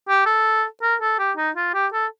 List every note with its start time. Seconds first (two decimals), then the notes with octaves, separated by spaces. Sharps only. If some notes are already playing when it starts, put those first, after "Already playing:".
0.09 G4
0.26 A4
0.82 A#4
1.01 A4
1.19 G4
1.37 D#4
1.56 F4
1.74 G4
1.93 A4